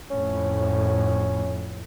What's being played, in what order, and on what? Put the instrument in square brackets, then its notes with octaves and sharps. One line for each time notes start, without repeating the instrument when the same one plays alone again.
[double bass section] F2 A2 [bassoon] C#4